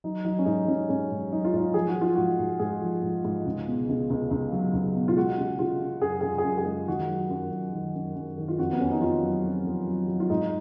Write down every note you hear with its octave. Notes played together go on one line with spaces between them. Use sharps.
F#3 D#4
F#3 D#4
C#4
G#2 D#4
F#3 C#4
G#2 C#4
G#2
F#3 D#4
F4
G#2 D#4
F3 G#4
F#4
F3
F4
G#2 F#4
G#2
G#2 G#4
F3
G#2
G#2
C#2
B2
C#2
C#2
C#2
F#3
C#2
B2
F4
G#3 F#4
C#3
C#3 F4
C#3
F#2 G#4
C#3 G#4
G#4
F#2
G#4
G#3
D#3 F#4
F#3
F#2
F#2
D#3
F#2
F#2
D#3
F4
F2 F#4
B3
F2 C#4
D#4
D#3 F4
F#3
F2
F2
F#3
F#3
F4
G#2 D#4